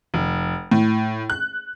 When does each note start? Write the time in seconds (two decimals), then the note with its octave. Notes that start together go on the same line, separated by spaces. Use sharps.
0.14 F1
0.71 A2
1.30 F#6